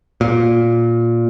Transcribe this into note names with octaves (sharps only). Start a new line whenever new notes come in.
A#2